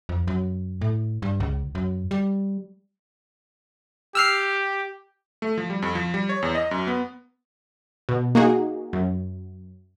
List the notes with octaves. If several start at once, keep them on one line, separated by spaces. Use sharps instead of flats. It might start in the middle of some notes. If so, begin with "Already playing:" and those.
F2
F#2
A2
G2
C#2
F#2
G3
G4 E6 F6 C7
A3
F3
G3
F2
F3
G3
C#5
E2
D#5
F#2
B3
B2
A#3 D#4 F#4 G#4
F#2